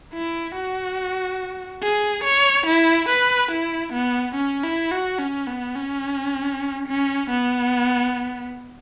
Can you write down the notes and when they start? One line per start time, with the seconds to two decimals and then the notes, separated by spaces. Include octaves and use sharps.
0.14 E4
0.56 F#4
1.82 G#4
2.24 C#5
2.67 E4
3.09 B4
3.51 E4
3.93 B3
4.35 C#4
4.64 E4
4.91 F#4
5.19 C#4
5.47 B3
5.75 C#4
6.88 C#4
7.30 B3